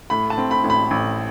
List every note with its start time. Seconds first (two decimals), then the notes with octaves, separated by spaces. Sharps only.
0.10 A2 B5
0.30 A5
0.38 C4
0.51 B5
0.64 A1
0.70 B5
0.91 A1